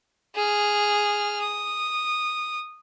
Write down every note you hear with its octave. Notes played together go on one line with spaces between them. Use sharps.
G#4 F6
D#6